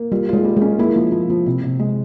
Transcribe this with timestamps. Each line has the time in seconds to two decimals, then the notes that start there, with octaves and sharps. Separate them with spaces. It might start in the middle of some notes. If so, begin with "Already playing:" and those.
Already playing: A#3
0.12 G3 F4
0.29 G#3 F4
0.44 G3
0.57 G#3
0.61 C#4
0.79 A#3 E4
0.96 F3
1.12 F3
1.30 F3
1.46 C3
1.64 C3
1.79 G#3